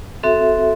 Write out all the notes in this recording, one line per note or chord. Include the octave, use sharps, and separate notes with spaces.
C4 F#4 A4 E5